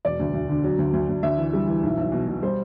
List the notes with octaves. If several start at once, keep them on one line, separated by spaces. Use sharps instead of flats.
E1 D5
D2
D2
D3
F#3
D2
D2
D2
D2 E5
E3
G3
E3
B1
B1
B2
B2
G3 C5